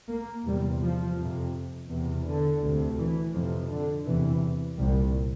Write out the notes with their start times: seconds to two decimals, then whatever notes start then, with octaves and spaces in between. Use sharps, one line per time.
0.10 A#3
0.46 E2 C3 G3
0.82 F3
1.17 F2 C3
1.89 E2 C3
2.25 D3
2.62 D2 C3
2.98 E3
3.33 F2 C3 F3
3.70 D3
4.06 E2 C3 E3
4.77 C2 A#2 G3